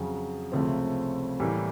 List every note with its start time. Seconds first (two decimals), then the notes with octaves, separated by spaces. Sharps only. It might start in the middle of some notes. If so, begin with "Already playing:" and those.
Already playing: F2 C#3 F#3
0.52 C#2 C3 F3 A3 C4
1.40 A2 E3 G3 A#3